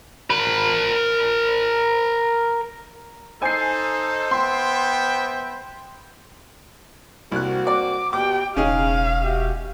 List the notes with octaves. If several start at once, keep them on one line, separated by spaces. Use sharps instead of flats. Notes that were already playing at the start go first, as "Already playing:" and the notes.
A#4 B5
D#4 A4 C5 G#5 C7
B3 E5 G5 C6
C2 A#3 C4 F#4 F#6
D5 D6
B2 G4 G5 D6
E1 C#3 C#4 D#4 G#4 F5
F#4 G4 E5